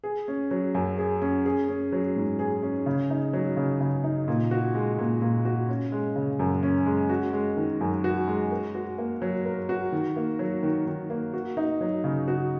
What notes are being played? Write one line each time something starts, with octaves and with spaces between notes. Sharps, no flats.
G#4
C#4
F#3
F#2
G#4
C#4
G#4
C#4
F#3
G#2
G#4
C#4
C#3
D#4
F#3
C#3
C#3
D#4
A#2
F#4
G#3
A#2
A#2
F#4
C#4
G#3
C#3
F#2
C#4
G#3
F#4
G#3
D#3
F#2
F#4
G#3
A#4
F#4
A#3
F#3
A#4
F#4
D#3
A#3
F#3
D#3
D#3
A#3
F#4
D#4
F#3
C#3
F#4